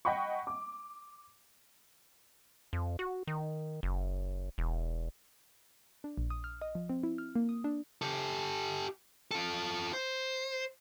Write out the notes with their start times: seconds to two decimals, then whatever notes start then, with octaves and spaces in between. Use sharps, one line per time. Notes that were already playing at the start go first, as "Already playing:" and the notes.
0.05 D#5 F#5 G5 B5 C#6
0.47 D6
2.73 F2
2.99 F#4
3.27 D#3
3.83 F#1
4.58 E1
6.04 D4
6.17 A#1
6.30 D#6
6.44 F6
6.62 D#5
6.75 F3
6.89 C4
7.03 E4
7.18 F6
7.35 A#3
7.49 D#6
7.64 D4
8.02 G4 A4
9.31 F4 A4
9.93 C5